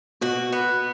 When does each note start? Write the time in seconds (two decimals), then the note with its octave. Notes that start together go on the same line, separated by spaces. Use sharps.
0.21 B2 F#4
0.53 B3